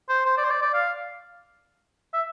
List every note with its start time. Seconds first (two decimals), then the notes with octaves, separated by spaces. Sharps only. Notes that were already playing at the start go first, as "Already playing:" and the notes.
0.09 C5
0.25 C5
0.38 D5
0.44 C5
0.50 D5
0.62 D5
0.74 F5
2.14 E5